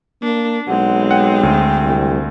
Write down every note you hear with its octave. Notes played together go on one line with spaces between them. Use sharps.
A#3 D4
B1 G#3 C4 F#5
F#5 G5
D2
C2